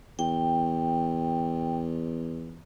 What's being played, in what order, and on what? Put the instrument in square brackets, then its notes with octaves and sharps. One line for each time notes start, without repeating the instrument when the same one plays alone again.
[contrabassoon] E2 [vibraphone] G5